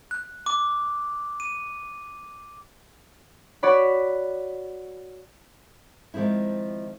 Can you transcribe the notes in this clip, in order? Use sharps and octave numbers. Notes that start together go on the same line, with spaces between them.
F#6
D6
D#7
F#4 C#5 D5 B5
D#3 F3 G#3 C4 E4